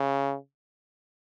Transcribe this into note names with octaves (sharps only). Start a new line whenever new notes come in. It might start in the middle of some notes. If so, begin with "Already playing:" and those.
Already playing: C#3